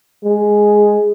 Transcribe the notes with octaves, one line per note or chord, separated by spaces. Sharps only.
G#3